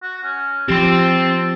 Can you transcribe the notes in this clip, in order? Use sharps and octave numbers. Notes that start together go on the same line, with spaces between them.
F#4
C#4
F3 C4 G4 A4 C6